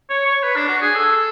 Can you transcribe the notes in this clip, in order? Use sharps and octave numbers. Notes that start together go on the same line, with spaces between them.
C#5
C#5
B4
D4
F#4
G#4
A4